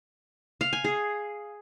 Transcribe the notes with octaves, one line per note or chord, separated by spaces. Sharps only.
F5
G#5
G#4